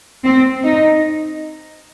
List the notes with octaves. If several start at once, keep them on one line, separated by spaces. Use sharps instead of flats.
C4
D#4